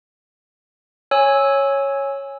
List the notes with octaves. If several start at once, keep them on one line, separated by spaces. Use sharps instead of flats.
C#5 G#5 E6